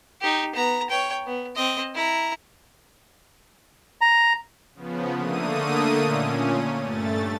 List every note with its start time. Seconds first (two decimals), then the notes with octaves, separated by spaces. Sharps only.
0.21 D#4 G4
0.55 B3 A#5
0.90 C#5 G5
1.26 B3
1.56 C4 D#5
1.94 E4 A#5
4.01 A#5
4.75 C#3 F3 B3
5.15 D3 A3 A#3 D#6 D#7
6.01 A#2 C#4
6.82 G2 A3 A6